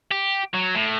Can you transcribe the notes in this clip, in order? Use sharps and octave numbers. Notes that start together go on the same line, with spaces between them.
G4
F#3
A2